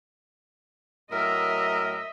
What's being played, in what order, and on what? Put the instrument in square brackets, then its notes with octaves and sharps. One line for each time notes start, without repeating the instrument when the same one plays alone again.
[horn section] A2 F#3 A#4 [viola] D#5 E5